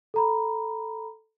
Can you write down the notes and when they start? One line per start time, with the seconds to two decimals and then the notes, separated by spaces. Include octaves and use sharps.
0.14 A4 A#5 B5